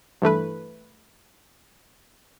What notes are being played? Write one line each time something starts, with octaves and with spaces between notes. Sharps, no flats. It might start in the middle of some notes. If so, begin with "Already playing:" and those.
G2 E3 A3 B4